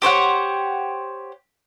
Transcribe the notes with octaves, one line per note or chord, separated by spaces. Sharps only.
G4 C5 C#5 F#5